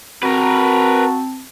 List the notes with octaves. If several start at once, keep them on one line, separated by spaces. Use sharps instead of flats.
C4 F#4 A#4 B4 A5